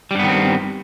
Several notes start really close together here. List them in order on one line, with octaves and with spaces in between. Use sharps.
G3 G2 B3 D#3 C4